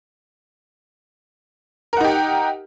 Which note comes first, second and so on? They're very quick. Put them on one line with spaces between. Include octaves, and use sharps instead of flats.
A#4 F#5 D#4 G4